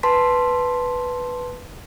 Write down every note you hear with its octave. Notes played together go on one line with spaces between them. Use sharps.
B4 A5 C6 B6